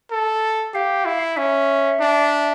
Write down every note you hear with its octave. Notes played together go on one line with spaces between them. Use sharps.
A4
G4 F5
E4
C#4 E5
D4